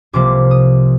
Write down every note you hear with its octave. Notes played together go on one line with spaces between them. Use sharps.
C2 C3 F3 A#3 D6
D#6